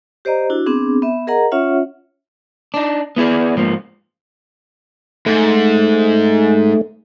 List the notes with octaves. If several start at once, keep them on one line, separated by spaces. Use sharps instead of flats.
G4 C5 D5 D#5 A#5
D4 E4 F#4
B3 C4 D4 G#4
B3 E5
G#4 A#4 D#5 F#5 A#5
C#4 F4 C#5 E5 F#5
D4 D#4
B3 E4 G#4 D5
G#2 F3 A#3
G#2 A3